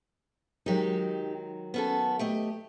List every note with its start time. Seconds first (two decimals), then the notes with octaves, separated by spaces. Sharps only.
0.66 D#3 F#3 G#3 D#4 G4
1.74 B3 C#4 A4
2.19 A3 G4 D#5